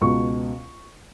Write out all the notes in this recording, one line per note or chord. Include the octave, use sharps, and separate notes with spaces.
C#2 B2 C#6